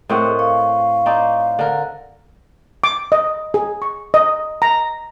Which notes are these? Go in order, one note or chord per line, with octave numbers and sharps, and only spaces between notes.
A2 C4 G#4 A#4 D#5 F#5 C#6
F5 C#6
C4 D#4 D5
D3 A#4
D6
D#5
G#4
C#6
D#5
A#5